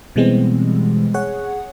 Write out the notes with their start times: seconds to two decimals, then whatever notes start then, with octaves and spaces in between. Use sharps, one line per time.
0.16 B2 E3 G3 G#3 B3 C4
1.14 G#4 C#5 F#5